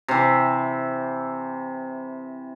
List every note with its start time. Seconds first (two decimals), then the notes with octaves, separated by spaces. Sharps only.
0.08 C3 E3